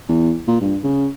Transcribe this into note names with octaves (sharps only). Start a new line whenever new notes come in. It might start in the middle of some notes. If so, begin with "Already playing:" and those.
E2
A#2
G2
C#3